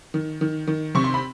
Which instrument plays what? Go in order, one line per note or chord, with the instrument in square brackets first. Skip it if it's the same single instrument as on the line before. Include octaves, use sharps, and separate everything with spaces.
[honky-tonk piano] D#3
D#3
D#3
C3 C#6
C6
B5